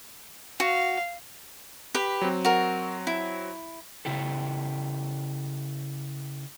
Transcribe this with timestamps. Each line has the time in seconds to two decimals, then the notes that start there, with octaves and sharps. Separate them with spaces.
0.60 F#4 F5
1.94 G4 B4
2.21 F#3 C4
2.45 F#4 A#4
3.07 E4
4.05 C#3 E4 G4 A4